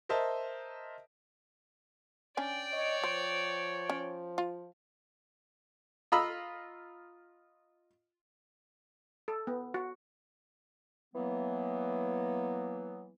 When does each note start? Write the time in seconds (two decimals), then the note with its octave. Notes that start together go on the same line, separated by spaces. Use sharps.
0.09 A#4 C5 D#5 E5 A5
2.37 C#4 D4 D5 G5 G#5
2.73 C#5 D#5
3.04 F3 C5
3.90 C#4
4.38 F4
6.12 F4 D#5 A#5 B5 E6
9.28 A4
9.47 B3
9.74 F#4
11.14 E3 F#3 A#3 B3